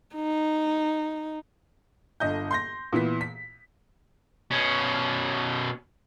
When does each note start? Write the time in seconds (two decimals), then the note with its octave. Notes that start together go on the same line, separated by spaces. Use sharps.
0.15 D#4
2.20 G1 D3 D#5 G6
2.51 C6 G6 A#6
2.93 A#2 E3 B3 B6
3.21 B6
4.51 B2 C#4